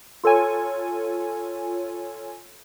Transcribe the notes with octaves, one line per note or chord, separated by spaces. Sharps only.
F4 A4 C#5 G#5